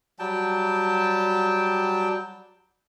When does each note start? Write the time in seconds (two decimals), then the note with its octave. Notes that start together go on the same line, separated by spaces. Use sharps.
0.19 F#3 G3 G5 A5